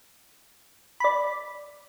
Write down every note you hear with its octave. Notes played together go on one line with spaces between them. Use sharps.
D5 B5